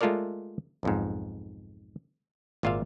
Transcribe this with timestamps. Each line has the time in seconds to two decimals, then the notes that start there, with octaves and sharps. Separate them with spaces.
0.01 G#3 A3 F4 A4 A#4 D5
0.83 B1 F2 G#2
2.63 G#1 A#2 F4 D5 E5 F5